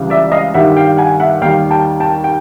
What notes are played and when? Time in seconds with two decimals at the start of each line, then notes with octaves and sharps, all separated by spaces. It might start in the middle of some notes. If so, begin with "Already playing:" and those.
Already playing: C#2 C#3 E3 G3
0.10 D5 E5
0.32 D#5 F5
0.54 G2 D#3 G3 E5 F#5
0.77 F5 G5
0.98 F#5 G#5
1.20 E5 F#5
1.41 D#2 D#3 G3 F5 G5
1.71 G5 A5
2.00 G5 A5
2.24 G5